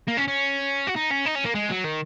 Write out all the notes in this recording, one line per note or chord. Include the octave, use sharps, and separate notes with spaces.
A#3
C#4
C#4
F#4
D#4
C#4
D#4
C#4
A#3
G#3
F#3
D#3